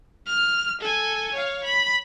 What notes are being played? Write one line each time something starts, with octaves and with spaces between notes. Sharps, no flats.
F6
A4 G#5
C#5 F5
B5